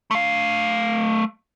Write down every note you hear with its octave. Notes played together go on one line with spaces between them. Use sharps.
A3 F5